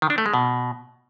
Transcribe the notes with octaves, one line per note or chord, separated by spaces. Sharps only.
D#3
D4
A3
G#3
B2